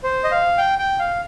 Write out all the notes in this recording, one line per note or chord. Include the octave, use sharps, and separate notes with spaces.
C5
D#5
F5
G5
G5
F5